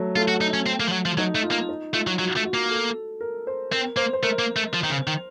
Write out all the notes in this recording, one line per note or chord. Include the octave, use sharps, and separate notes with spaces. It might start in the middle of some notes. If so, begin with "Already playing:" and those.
Already playing: F#3 A3
A3 F4
F#4
D#4
C#4
C4
A#3
F3
F#3
F3
F#3 D#4
A3
F4
A#3
D#4
A3 F4
F#3 F4
F#3 F#4
A3
F#4
A#3
A4
A#4
C5
C4 A#4
A#3 C5
C5
A3 A#4
A#3
A3
F3
D#3
C#3
D#3